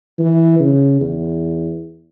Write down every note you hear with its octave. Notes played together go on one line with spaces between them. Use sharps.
E3
C#3
E2